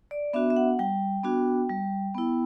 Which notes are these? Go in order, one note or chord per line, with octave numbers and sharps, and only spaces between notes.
D5
B3 D4 F#4 E5
E5
F#5
G3 G5
B3 D4 F#4
G3
B3 E4